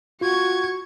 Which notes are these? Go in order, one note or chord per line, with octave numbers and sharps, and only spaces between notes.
F4 F#4 C#6 G#6